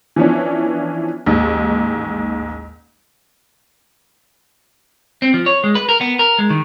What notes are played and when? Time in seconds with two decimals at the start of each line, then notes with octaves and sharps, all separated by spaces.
0.16 E3 F3 B3 C#4 D4
1.26 A1 D#2 G#2
5.22 C4
5.34 F3
5.46 C#5
5.64 G#3
5.75 B4
5.89 A#4
6.01 B3
6.19 A#4
6.39 G#3
6.50 D#3